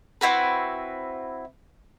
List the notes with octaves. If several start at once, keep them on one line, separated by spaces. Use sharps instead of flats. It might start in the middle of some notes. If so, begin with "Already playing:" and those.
C4 E4 F#4 B4